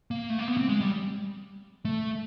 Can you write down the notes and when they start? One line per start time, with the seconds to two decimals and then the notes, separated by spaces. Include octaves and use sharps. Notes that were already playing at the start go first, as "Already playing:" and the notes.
0.11 A#3
0.30 A3
0.39 A#3
0.48 B3
0.57 C4
0.69 G#3
0.81 G3
1.85 A3